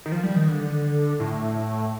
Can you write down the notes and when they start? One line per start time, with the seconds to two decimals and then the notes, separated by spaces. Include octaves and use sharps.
0.06 D#3
0.12 F3
0.23 G3
0.36 D#3
0.48 D3
1.20 A2